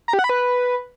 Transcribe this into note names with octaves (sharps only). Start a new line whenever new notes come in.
A#5
G4
F#5
B5
B4